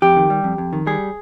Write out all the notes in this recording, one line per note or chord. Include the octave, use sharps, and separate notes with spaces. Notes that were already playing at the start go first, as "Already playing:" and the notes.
F2 G4
D#3
G3
F2
F2
D#3
G3 G#4